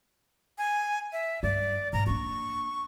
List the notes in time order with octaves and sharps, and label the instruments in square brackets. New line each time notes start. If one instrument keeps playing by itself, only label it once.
[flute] G#5
E5
[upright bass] G2 [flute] D5
[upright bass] G#2 [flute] A#5
[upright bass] A#3 D4 [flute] C#6